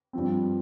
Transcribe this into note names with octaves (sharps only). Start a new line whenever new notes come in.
G2 F3 C4